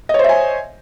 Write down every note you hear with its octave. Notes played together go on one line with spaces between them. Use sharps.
C5 C#5 D#5 E5 G#5